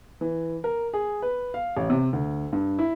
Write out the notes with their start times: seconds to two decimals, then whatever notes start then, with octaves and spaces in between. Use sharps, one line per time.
0.21 E3
0.64 A#4
0.93 G#4
1.22 B4
1.54 F5
1.77 A1
1.90 C3
2.13 D2
2.52 G2
2.79 E4